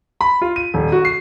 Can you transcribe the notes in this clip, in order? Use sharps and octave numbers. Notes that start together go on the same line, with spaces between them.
B5
F4
D#7
D#1
F#4
C7